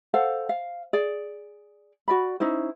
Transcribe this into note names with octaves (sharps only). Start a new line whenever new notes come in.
A4 C5 F5 F#5
F5
G#4 D5
F#4 D5 B5
C#4 D#4 E4 C5